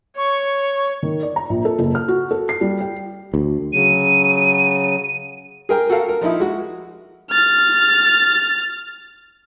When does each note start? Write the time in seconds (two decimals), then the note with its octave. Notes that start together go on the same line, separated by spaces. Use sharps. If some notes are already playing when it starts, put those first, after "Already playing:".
0.17 C#5 C#6
1.03 D#3
1.23 D5
1.36 A#5
1.49 A#1
1.65 A4
1.79 F#1
1.95 F6
2.08 F#4
2.31 A4
2.49 C7
2.61 G3
2.80 G5
3.34 D2
3.73 C#3 F#3 D#7
5.69 G#4 A#4 G5
5.90 F#4 A4 A#4 F5
6.09 A#4
6.21 F3 D#4 E4
6.40 G#3 F#4
7.31 F6 A6